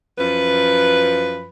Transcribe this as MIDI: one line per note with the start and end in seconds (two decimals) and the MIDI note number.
0.19 1.48 42
0.19 1.48 53
0.19 1.48 71